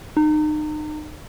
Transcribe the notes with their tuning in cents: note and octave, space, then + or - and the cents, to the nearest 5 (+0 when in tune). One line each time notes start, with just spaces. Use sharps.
D#4 -35